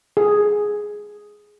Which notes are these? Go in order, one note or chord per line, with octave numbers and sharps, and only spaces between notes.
G#4